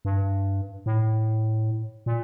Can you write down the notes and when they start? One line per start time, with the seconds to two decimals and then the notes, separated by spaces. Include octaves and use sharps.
0.05 G2
0.86 A2
2.06 A#2